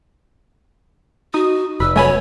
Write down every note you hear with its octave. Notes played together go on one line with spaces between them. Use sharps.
D#4 F#4 D#6
F1 B4 E6
F#2 A3 B3 C#5 G#5 B5